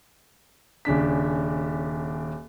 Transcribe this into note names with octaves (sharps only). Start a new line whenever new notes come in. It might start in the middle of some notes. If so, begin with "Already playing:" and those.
D#1 C#3 D4 B6